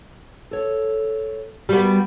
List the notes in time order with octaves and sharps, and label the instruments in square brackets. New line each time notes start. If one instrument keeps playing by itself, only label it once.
[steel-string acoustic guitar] A4 C#5
[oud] G3 B3 [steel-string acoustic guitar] F#4 A#4